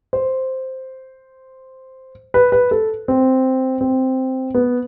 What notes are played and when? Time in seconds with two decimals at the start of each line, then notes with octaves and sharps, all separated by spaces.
0.13 C5
2.34 B4
2.52 B4
2.71 A4
3.08 C4
3.81 C4
4.54 B3